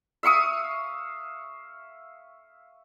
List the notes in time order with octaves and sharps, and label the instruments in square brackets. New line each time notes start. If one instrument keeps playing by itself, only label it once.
[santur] E5 F5 C#6 D#6